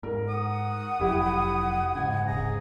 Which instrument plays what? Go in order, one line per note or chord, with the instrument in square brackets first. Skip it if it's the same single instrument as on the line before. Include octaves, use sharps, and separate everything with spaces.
[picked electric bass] G#2 [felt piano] A#4
[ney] F#5 [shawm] D#6
[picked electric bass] F1 F2 F#3 [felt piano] E4 G4
[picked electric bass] G#2 C#3 [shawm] G#5
[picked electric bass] D#1 G#2 C#3 [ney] G#4 [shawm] A#5